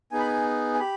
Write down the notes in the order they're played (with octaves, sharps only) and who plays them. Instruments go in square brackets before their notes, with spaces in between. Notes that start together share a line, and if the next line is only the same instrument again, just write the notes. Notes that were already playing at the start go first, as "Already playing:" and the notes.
[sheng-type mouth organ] B3 D#4 G#4 G#5
B5
G#5
G#5
G4 B5